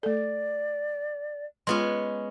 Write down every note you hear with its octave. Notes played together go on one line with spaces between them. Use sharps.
A3 A4 D5
G#3 B3 C#4 F4 B4 C6